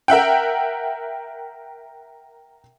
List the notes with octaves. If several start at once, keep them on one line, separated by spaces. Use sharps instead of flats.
A#4 E5 F#5 G5